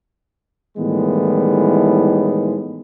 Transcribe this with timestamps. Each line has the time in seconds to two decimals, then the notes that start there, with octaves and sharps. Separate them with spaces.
0.77 A2 D#3 E3 G3 G#3 B3